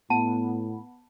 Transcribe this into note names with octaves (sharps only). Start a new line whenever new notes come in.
A2 B3 A5